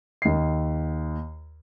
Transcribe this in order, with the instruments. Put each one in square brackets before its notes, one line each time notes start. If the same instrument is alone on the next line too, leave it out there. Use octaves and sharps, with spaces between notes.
[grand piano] D#2 C7